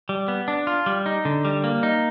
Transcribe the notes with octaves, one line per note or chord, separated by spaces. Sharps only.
G3
B3
D4
F4
G3
D#4
D3
G3
A#3
D#4